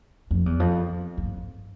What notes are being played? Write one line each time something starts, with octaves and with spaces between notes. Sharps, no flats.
F2
E2
F2
F2
G2